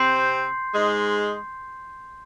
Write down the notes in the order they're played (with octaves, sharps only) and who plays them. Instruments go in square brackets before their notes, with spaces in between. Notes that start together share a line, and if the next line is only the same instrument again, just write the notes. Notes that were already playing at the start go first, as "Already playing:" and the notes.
Already playing: [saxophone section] C3 C4 [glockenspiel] C6 G6 C7
[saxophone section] G#2 G#3